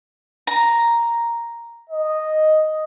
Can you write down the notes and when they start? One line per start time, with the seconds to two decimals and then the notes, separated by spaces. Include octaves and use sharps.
0.47 A#5
1.90 D#5